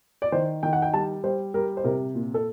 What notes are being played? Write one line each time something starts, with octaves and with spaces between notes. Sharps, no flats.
D5
D#3 C5
D#3 G5
F#5
G5
G3 A5
G3 C5
G3 A#4
C5
C3 A#4
A#2
A4